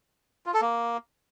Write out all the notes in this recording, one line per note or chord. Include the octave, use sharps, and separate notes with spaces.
F4
A4
A#3